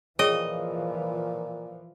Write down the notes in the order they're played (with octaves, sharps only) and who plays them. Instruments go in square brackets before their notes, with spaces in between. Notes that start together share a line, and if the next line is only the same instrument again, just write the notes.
[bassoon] A#2 [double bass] E3 F3 [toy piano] G#4 C#5 G5 [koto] D#5